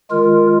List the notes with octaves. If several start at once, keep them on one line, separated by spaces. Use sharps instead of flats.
D#3 G#3 F4 A#4